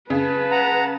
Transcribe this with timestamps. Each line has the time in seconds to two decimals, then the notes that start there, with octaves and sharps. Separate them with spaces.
0.10 C#3 B4 A5
0.51 F#5 A#5